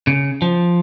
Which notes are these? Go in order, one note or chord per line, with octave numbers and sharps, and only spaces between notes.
C#3
F3